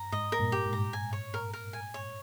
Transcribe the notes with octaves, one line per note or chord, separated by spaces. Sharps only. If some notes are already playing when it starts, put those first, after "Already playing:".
Already playing: G2 A#5
G#2 D#5
A#4
G2 A#2
G4
G#2
A#5
G#5
C#5
A#4
A#4
G#5
C#5